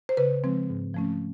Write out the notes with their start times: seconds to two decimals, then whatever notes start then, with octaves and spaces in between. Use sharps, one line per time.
0.09 C5
0.17 C#3 B4
0.44 F3 G#3 C4
0.69 G#2
0.94 F3 A3 C#4